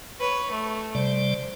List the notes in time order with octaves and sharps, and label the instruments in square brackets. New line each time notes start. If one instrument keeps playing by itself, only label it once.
[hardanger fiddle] B4 C#5
A3
[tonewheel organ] C3 G3 D5 [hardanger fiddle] C5